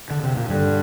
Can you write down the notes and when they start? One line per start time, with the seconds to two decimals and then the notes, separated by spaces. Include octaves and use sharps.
0.10 D3
0.23 C3
0.37 A#2
0.49 G2 D3